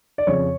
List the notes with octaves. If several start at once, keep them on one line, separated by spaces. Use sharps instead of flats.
D5
F2 C#3 F3 C#5